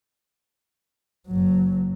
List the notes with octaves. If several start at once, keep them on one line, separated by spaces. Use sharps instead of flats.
F#1 F#3